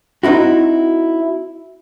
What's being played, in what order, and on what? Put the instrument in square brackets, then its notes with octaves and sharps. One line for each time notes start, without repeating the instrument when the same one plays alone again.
[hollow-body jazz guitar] C4 D#4 E4 F#4